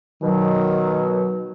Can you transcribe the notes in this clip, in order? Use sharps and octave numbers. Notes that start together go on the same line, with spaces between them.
B2 D#3 F#3